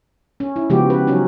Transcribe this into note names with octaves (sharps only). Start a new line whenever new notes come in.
C#4
E4
C#3 F3 G#3 B3 F#4 G4
B4
F#3 C#4 D#4